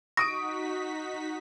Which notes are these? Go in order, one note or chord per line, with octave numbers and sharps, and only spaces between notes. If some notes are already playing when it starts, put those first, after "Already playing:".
D#4 F#4 C#6 D#6 A#6 B6 D7